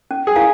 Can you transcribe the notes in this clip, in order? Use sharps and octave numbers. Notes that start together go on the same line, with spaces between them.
C#4
G#4
E4 A#4 F5 A#5